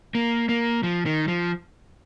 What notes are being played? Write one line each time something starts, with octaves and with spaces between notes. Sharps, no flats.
A#3
A#3
F3
D#3
F3